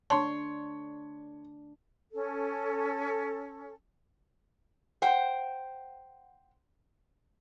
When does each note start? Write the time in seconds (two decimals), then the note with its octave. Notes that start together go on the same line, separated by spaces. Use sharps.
0.10 A3 D4 C#5 A5 C6
2.13 C#4 A4
5.02 C5 F#5 G5